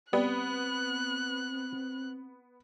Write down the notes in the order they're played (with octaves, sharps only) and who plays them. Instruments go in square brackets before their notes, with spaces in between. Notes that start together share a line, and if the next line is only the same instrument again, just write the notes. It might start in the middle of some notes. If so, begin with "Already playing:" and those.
[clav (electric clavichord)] G3 [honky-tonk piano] B3 [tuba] C4 [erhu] F#6